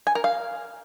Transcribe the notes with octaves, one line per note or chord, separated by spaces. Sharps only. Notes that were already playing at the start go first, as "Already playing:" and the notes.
G#5
A#4
F5